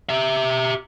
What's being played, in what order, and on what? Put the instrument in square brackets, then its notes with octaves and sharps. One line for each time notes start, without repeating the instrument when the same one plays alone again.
[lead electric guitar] G4 E5